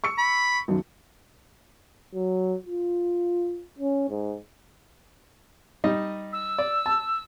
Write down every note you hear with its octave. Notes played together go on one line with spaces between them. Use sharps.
C#6 E6 C#7
B5
B1 F#2 D#3
F#3
F4
C#4
G#2
G3 D#4 D#5
E6
D5
A5